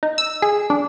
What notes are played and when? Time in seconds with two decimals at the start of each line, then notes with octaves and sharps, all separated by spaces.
0.03 D#4
0.18 E6
0.42 G#4
0.70 D4